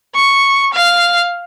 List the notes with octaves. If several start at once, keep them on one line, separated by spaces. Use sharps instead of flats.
C#6
F5